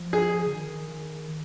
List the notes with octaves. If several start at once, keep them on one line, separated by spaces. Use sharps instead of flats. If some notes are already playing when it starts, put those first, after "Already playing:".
Already playing: F3
G#4
D3
D#3